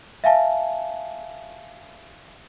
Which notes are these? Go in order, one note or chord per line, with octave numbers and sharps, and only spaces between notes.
E5 F5 G#5 A5